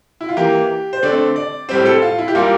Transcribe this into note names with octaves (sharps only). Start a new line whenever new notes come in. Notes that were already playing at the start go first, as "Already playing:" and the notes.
E4
F4
E3 A#3 G4
C5
D3 A3 C4 D5
D5
A2 G3 C4 C5
A4
F4
E4
G4
A#2 G3 A#3 F4